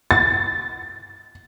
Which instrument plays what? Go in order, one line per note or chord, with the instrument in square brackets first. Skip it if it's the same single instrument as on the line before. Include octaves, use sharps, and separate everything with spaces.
[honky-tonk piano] A6